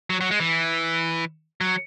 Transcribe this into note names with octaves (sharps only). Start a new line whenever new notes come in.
F#3
F#3
G#3
E3
F#3